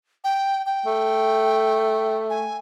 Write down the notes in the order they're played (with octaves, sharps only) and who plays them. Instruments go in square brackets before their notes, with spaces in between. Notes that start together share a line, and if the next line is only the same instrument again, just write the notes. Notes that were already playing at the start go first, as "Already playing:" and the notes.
[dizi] G5
G5
[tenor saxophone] A3
[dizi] G#5